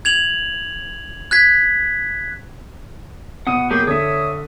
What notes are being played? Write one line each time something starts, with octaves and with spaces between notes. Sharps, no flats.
G#6 F7 F#7
F#6 G#6 B6
B2 F#5 D#6 D#7
F#3 A#3 G4 G#4
D3 C#5 E5 D#6